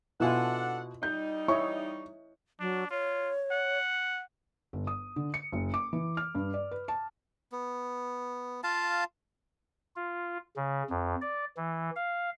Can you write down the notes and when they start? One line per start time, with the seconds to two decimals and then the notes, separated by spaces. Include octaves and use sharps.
0.20 B2 D4 E4 F4 A4 F#5 G#5
1.03 G3 D#4 G6
1.48 E4 C#5 D#5 C#6
2.60 F#3 D4
2.90 F4 C#5
3.51 F#5
4.73 G1
4.87 D#6
5.16 D3
5.34 C#7
5.52 F#1
5.74 D6
5.93 E3
6.17 F6
6.35 G2
6.54 D5
6.71 B4
6.88 A5
7.52 B3
8.64 F4 F5 A5
9.96 F4
10.56 C#3
10.90 F2
11.21 D5
11.57 E3
11.96 F5